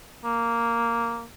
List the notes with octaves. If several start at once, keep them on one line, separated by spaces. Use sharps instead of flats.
A#3